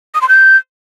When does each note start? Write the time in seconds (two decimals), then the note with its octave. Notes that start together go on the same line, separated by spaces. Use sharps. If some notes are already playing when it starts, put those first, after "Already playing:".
0.15 D#6
0.22 C6
0.29 G6